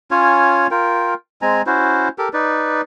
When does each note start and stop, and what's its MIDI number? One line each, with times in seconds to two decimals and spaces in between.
0.11 0.67 61
0.11 0.67 65
0.11 0.67 73
0.11 0.67 80
0.71 1.14 65
0.71 1.14 70
0.71 1.14 79
1.42 1.62 56
1.42 1.62 60
1.42 1.62 80
1.42 1.62 82
1.67 2.08 61
1.67 2.08 64
1.67 2.08 66
1.67 2.08 72
2.18 2.29 67
2.18 2.29 69
2.18 2.29 70
2.33 2.81 63
2.33 2.81 71
2.33 2.81 74